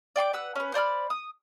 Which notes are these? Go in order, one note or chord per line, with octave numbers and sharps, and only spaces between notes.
D5 G5 C6 D6
B4 F#5 E6
C#4 B4
C5 D5 B5 F6
D#6